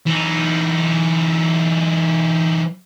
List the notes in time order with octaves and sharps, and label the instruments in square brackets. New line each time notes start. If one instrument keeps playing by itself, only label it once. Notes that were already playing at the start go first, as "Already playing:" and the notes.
[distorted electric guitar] E3 D#4